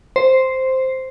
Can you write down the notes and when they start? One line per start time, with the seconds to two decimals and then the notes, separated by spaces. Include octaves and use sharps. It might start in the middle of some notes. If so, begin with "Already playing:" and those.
0.16 C5